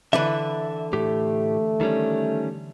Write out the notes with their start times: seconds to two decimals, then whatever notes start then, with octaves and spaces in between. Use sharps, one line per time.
0.13 D3 E3 B4 E5
0.93 A2 A3 G4
1.81 D#3 G3 C#4